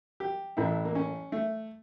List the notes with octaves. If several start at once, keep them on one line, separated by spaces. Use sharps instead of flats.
G4
A1 A2 E3 E4
A#3
C#4
A3